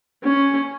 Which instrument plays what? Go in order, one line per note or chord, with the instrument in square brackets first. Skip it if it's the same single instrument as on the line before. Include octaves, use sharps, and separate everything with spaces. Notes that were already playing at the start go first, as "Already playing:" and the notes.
[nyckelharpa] C#4